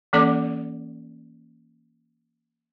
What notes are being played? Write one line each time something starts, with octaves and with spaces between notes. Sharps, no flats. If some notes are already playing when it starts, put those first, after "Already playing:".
E3 A#3 C#4 A4 D5 D6